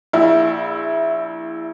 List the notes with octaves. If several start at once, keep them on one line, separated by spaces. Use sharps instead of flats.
A#1 E4